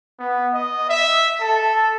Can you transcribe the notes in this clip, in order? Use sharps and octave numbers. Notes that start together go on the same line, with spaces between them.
B3
D#5
E5
A4